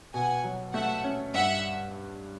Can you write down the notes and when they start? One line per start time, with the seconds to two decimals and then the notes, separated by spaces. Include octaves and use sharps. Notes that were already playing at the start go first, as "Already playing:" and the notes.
0.13 B2 F#5 G#5
0.44 F#3
0.73 A3 E5 F#5
1.04 C#4
1.34 G2 E5 F#5